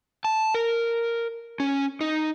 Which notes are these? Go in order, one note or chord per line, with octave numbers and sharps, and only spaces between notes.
A5
A#4
C#4
D#4